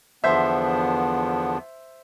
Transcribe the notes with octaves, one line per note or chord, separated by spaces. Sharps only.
E2 D3 F3 B3 C5 E5